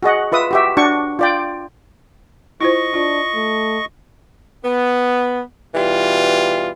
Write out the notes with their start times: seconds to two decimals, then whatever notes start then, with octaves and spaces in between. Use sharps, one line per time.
0.03 F#4 G#4 D#5 F#5
0.32 F4 B4 E5 D#6
0.51 F#4 G4 E5
0.77 D4 F#4 C#6
1.19 F4 D5 G5
2.61 E4 F4 C5 D#5 C#6
2.94 D4 F4
3.35 A3
4.64 B3
5.75 B2 E3 G3 F4